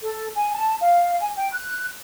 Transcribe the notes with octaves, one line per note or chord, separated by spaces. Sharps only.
A4
G#5
A5
F5
G#5
G5
F#6